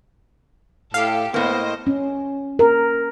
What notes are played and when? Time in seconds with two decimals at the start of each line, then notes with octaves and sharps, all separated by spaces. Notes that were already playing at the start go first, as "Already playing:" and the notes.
0.94 A2 G4 A4 F5
1.34 A2 A#3 B3 C5 D#5
1.87 C#4
2.59 A#4